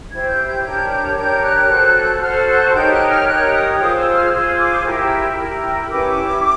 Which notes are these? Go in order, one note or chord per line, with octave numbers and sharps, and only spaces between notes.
E4 G4 C5 G#6
G6
G6
D4 G4 A#4 C#5 G6
G6
D4 G4 A#4 C#5 G6
F#6
F#4 A4 C5
F#4 A4 C5 F6
F#6
D#4 G4 A#4 C#5 G6
F#6
F6
D#4 G4 A#4 C#5 F#6
D#6
F4 G#4 C5 D#6
E6
F6
F6
F4 G#4 C5 E6
D6
E4 G4 A#4
E4 G4 A#4
C#4 E4 G4 B4 D6